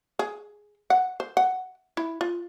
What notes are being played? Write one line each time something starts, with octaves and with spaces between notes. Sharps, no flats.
G#4
F#5
C5
F#5
E4
F4